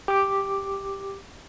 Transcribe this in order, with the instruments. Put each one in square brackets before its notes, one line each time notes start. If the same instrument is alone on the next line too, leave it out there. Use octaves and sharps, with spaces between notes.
[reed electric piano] G4 D6